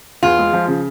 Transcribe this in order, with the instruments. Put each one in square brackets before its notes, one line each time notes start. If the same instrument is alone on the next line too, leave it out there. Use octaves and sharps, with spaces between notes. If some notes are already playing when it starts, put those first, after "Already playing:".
[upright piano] E2 [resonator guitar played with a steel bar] F4
[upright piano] G#3
F3
C#3